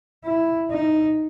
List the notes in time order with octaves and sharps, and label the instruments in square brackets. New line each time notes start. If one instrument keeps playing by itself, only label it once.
[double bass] E4
D#4